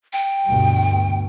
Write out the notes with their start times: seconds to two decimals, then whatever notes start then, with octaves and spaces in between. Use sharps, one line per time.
0.13 G5
0.47 D2 G2 B2